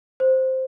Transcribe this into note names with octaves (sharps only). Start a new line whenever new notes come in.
C5